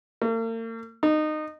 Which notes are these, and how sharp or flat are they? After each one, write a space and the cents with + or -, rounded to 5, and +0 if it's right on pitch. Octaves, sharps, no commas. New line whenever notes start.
A#3 -45
D#4 -20